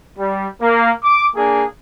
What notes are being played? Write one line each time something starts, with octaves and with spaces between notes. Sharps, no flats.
G3
A#3
D6
A#3 D4 G#4